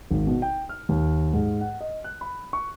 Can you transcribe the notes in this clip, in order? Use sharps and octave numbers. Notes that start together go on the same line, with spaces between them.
G#1
B2
G5
F6
D#2
G#2
F#5
D#5
F#6
B5
C#6